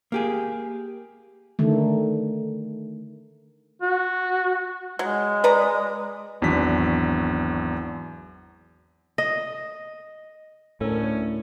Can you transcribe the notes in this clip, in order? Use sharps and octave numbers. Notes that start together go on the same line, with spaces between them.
A#3 G4 G#4
D3 D#3 A3
F#4
F#3 G#3
B4 D5 A#5
G#1 E2 F#3 D4 B6
D#5
D2 A2 C#4 A4 A#4